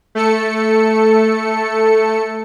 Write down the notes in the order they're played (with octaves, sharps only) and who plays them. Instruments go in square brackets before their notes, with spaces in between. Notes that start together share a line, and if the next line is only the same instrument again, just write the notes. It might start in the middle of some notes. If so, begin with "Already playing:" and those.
[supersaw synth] A3 A4 C#7